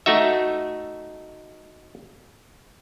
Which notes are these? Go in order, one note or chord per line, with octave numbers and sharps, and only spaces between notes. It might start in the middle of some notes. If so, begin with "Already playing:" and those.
A3 D#4 F#4 E5